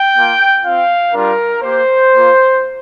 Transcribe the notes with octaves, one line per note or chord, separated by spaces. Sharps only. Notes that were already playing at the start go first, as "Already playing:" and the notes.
Already playing: G5
A#3 F4
C4 F4 F5
G3 D4 F4 A#4
A#3 G4 C5
A#3 F4